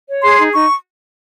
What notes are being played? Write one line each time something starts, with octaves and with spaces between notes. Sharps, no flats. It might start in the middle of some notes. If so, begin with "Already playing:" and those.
C#5
G#4 C6
D#4
D#4 C#6